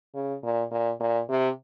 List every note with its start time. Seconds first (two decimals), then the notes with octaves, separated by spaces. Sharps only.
0.14 C#3
0.43 A#2
0.71 A#2
1.00 A#2
1.29 C3